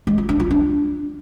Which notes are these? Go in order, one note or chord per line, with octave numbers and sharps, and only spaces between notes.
G#3
F4
D4
F4
D4